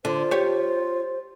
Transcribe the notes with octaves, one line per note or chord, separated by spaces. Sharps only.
D3 F4 C5
G4 C#5